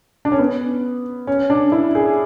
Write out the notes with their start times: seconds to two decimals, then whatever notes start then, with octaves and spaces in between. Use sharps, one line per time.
0.25 D4
0.32 C#4
0.39 B3
1.27 C#4
1.50 D4
1.72 E4
1.95 G#4